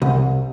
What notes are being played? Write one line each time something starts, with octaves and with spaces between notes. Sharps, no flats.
C2